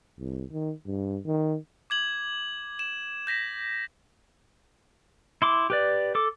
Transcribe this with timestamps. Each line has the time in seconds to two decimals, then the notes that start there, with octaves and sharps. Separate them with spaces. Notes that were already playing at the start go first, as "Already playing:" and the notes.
0.19 C2
0.52 D#3
0.86 G2
1.26 D#3
1.90 D6 G#6 F#7
2.79 E7
3.27 G6 A#6 B6 E7
5.42 E4 C6 D6
5.70 G4 B4 D5
6.15 A4 D6